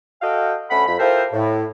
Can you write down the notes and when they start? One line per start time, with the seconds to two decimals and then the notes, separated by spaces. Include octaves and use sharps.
0.22 F#4 A4 D#5 F5 G5
0.70 D2 A3 C#4 F#5 B5
0.86 F2 B5
0.99 E4 F4 G4 A4 A#4 C5
1.33 A2